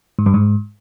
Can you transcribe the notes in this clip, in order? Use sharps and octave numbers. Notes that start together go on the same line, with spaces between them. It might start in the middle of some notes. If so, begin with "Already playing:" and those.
G#2
G2
G#2